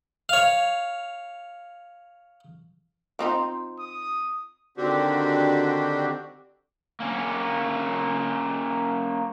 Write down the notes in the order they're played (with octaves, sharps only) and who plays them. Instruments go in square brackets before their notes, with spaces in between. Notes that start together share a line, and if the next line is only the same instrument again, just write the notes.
[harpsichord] C#5 F5
[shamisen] F3 C4 D#4
[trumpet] D#6
[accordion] D3 D#3 C4 D4 F#4 G4
[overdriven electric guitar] A#3 C#4